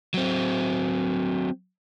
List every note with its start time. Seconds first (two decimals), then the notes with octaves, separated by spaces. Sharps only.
0.14 F#3 C4